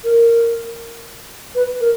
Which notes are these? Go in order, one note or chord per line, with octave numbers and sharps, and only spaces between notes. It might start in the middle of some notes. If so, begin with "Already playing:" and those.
A#4
B4
A#4